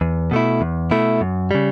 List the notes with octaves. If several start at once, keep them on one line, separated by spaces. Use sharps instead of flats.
E2
B2 A3 E4
E2
B2 A3 E4
F#2
C#3 G3